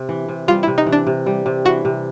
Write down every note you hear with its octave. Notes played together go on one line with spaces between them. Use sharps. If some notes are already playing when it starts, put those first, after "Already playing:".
Already playing: C3
E3
C3
G3 F4
C3 E4
D#4
E3
D4
C3
G3
C3
E3 F#4
C3